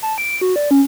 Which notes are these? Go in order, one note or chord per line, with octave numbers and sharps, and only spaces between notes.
A5
D7
F#4
D5
C#4